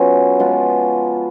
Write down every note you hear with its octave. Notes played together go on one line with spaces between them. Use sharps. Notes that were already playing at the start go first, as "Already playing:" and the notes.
Already playing: F#3 B3 C#4 F4 G#4
F3 G#3 B3 F4